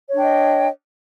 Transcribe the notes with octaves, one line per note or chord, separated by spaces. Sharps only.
D4 C#5 D#5 G5